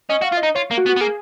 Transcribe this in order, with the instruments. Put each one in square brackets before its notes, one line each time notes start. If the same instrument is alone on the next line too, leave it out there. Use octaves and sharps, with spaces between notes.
[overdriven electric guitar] C#4 [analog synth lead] D#5
[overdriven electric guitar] F#4 [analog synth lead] F5
[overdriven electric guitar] F4
[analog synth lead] D#5
[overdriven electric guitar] D#4
[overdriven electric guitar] F4 [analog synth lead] C#5
[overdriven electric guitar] A#3
[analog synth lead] F#4
[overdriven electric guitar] B3
[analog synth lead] F#4
[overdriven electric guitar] B3
[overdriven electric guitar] A#3 [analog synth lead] G#4